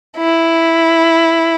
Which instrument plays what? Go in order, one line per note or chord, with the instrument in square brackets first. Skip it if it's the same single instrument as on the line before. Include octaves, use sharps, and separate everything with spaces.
[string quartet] E4